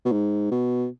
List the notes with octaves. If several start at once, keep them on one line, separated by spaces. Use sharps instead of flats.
B2
G#2
B2